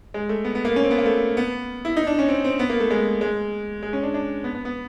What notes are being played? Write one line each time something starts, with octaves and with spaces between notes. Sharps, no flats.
G#3
A3
B3
B3
A#3
C#4
C4
B3
A#3
A3
B3
E4
D#4
D4
C#4
C4
C4
B3
A#3
A3
G#3
G#3
G#3
C#4
D4
D4
B3
B3
B3